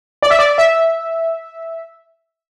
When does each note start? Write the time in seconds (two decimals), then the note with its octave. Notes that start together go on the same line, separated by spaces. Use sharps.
0.23 D5
0.31 E5
0.39 D5
0.58 E5